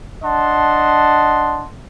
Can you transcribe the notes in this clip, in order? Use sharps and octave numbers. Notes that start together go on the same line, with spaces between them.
D4 D#5 F#5 A5 C6